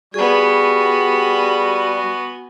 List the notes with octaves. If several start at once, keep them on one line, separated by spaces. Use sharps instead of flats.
G3 B3 F#4 G#4 G#5